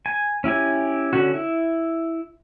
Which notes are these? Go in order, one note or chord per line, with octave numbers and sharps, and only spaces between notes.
G#5
C#4 E4 G4 G#5
D3 C#4 F#4
E4